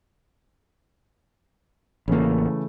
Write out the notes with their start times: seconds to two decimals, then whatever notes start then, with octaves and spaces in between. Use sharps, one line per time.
2.08 A1 C#3 E3 A3 A#3